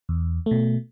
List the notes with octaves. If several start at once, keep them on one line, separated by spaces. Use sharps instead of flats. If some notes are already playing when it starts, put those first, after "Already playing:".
E2
B2 A3